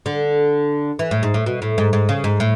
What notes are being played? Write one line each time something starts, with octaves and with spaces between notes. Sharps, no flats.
D3
E3
A2
G#2
A2
B2
A2
G#2
G#2
C#3
G#2
A2